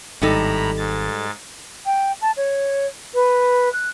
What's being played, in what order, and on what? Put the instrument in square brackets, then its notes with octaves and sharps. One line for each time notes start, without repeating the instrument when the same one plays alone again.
[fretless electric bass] G#1 [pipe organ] A2 A#5 B5 [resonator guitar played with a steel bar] G3 D#4 A4
[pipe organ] G#2 A6
[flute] G5
A5
C#5
B4
F#6